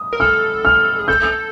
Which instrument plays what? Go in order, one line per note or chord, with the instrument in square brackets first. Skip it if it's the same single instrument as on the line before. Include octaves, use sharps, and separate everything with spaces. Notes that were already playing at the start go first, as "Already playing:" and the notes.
Already playing: [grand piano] D#6
[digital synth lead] A#4
[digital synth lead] A4 [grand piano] F6
[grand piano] F6
[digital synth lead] G#4
[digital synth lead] A4 [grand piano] G6